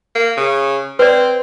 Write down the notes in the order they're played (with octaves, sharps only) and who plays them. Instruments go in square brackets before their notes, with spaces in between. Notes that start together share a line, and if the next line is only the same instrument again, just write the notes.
[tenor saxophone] A#3
C#3
[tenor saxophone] C4 [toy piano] B4 D5